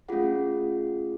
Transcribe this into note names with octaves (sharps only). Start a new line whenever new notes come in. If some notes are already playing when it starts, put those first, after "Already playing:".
A3 C#4 F4 G#4 F#5